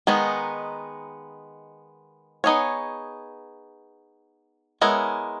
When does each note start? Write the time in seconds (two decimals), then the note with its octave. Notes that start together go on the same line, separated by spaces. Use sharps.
0.07 D#3 G#3 B3 D#4
2.44 B3 D#4 G#4 C#5
4.81 G#3 B3 E4 A#4 C#5